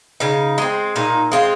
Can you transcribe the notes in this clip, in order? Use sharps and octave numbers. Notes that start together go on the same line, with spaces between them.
C#3 D#4
G#3 C4
A#2 D#4
G#3 C4 F4